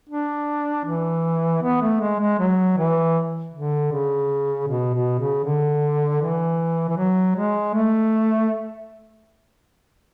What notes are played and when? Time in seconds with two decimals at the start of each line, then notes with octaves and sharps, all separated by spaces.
0.09 D4
0.85 E3
1.62 B3
1.81 A3
2.01 G#3
2.20 G#3
2.39 F#3
2.78 E3
3.54 D3
3.92 C#3
4.68 B2
4.94 B2
5.20 C#3
5.44 D3
6.21 E3
6.89 E3
6.97 F#3
7.36 G#3
7.74 A3